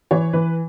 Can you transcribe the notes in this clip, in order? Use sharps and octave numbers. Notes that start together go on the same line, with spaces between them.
E3 C#5
E3 B4